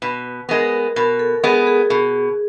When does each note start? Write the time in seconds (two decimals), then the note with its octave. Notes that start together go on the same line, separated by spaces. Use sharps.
0.02 B2 B4
0.49 G#3 B3 A#4
0.96 B2 A#4
1.19 A4
1.43 G#3 B3 G#4
1.67 G#4
1.90 B2 G#4